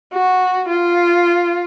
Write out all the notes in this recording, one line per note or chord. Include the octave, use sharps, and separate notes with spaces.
F#4
F4